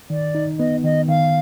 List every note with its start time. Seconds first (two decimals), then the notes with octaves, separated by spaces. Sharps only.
0.10 D#3 D5
0.35 D#4
0.59 B3 D#5
0.84 D#3 D#5
1.08 D#3 F5